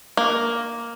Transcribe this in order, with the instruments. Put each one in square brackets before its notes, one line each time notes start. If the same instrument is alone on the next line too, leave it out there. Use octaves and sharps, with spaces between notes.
[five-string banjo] A#3